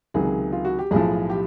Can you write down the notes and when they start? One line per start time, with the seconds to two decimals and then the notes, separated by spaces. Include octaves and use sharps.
0.14 C#2 C3 D#3 F#3 G#4
0.52 F4
0.65 F#4
0.79 G4
0.91 B1 A2 F3 G#4
1.30 G4